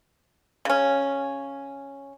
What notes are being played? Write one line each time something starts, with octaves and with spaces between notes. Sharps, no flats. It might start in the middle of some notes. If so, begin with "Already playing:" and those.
C#3 C#4